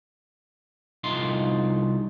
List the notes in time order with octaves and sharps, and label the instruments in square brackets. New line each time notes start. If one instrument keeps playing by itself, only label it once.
[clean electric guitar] C2 D#4 F4 C6